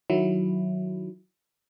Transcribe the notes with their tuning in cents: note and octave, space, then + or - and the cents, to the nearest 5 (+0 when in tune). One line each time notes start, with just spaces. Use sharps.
D#3 +0 F#3 +0 E4 +0